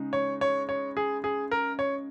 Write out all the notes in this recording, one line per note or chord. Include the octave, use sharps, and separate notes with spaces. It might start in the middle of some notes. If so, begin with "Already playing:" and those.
Already playing: C#3 G#3 D#4
C#5
C#5
C#5
G#4
G#4
A#4
C#5